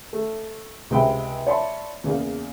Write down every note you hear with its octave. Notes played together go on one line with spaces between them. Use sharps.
A3
C#2 C3 G#3 E5 G5 B5
C#5 D5 E5 A5 B5 C6
E2 C#3 A#3